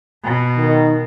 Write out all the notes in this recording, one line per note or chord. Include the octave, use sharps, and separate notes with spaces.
B2
D#3